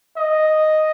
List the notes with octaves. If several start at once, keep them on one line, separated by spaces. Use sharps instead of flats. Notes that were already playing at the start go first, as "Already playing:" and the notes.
D#5